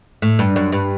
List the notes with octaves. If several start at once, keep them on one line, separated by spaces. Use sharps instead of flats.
A2
G2
F#2
G2